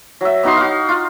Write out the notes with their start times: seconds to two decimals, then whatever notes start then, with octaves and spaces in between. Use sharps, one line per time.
0.21 F#3 E5
0.43 B3 D#4 F#4 C6
0.57 F#4 F5
0.89 F4